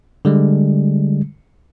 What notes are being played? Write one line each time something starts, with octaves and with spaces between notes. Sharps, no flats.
D3 G3 G#3